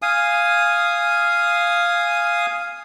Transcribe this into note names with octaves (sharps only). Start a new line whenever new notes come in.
F5 G#5 D#6